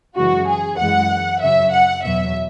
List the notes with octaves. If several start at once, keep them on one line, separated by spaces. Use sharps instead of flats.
F#2 C#3 E3 G#3 F#4
G#4
F#2 E3 G#3 F#5
F#2 C#3 F#3 E5
F#5
E2 B2 F#3 E5